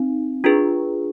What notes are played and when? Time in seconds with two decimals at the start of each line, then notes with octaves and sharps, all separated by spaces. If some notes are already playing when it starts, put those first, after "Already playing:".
Already playing: C4 D#4
0.44 D4 F4 G#4 B4